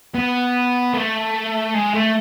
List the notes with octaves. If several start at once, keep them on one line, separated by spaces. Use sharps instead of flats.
B3
A3
G#3
A3